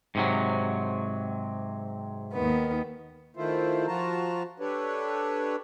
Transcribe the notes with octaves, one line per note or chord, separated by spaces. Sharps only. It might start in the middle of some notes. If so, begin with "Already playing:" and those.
G#2 C3 F#3
D#2 D#3 B3
D#3 A3 E4 F4 C5
F3 F4 F#4 A5 A#5
D4 G4 A4 B4 C#5